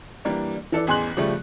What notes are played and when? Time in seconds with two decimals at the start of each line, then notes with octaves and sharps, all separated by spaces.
0.25 E3 G3 A#3 D4
0.72 E3 A4 D5
0.87 A1 E2 G#4 C6 F#6 F#7
1.17 C#3 F3 G3 A3